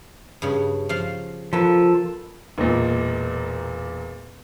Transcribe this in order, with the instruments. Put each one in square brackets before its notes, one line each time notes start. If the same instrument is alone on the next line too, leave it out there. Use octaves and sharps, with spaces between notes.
[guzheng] G2 C#3
F3 F5
[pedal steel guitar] F3 A4 [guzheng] A#3 B4
[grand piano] E1 A#2